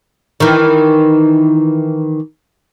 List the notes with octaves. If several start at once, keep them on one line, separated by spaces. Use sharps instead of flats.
D#3 E3